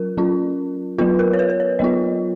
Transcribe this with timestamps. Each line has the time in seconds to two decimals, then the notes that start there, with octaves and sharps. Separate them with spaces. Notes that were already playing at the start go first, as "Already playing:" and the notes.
Already playing: F#3 C#4 F4 A#4
0.17 F#3 C#4 F4
0.98 F#3 B3 F4 B4
1.19 A#4
1.33 C#5
1.39 B4
1.50 B4
1.60 C#5
1.79 F#3 B3 F4 D#5